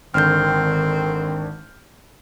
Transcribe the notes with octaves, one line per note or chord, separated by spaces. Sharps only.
G#1 D3 D#3 C4 F6 G6